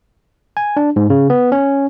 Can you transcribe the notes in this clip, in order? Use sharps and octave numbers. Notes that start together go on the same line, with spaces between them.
G#5
D4
G#2
C#3
B3
C#4